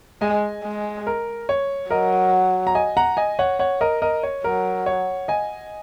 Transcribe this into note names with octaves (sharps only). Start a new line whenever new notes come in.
G#3 D#5 G#5
G#3
A#4
C#5
F#3 A#4 D#5
A#5
D#5 G#5
F#5 A#5
D#5 G#5
C#5 F#5
C#5 F#5
A#4 D#5
A#4 D#5
C#5
F#3 A#4
C#5
D#5 G#5